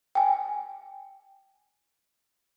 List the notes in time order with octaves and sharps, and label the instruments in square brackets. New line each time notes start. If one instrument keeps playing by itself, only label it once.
[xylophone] G5 G#5